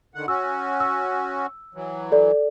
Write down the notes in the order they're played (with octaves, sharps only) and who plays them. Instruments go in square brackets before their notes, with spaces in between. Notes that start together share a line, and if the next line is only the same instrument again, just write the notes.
[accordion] D3 D#3 F#5
[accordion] C#4 F#4 [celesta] E6
[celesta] E6
[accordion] E3 F#3
[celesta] A4 D5